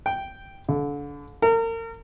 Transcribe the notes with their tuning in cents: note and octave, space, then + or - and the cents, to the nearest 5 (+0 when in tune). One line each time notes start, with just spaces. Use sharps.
G5 -5
D3 -35
A#4 -35